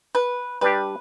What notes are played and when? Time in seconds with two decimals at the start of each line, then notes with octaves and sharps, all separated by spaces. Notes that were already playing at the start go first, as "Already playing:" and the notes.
0.15 B4
0.61 G3 D4 G4 B4